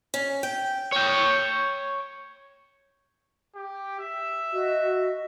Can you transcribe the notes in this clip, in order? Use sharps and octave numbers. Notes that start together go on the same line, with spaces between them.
C#4
G5
C#5 G5
G4
E5
F#4 D#5